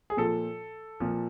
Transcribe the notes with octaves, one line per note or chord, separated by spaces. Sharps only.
G#4
A#2 F3 A4
A#2 F3